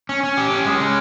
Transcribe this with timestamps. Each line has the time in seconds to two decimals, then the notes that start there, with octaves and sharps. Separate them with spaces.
0.09 C#4
0.23 C#4
0.37 G4
0.51 C#4
0.65 G#3
0.80 C#4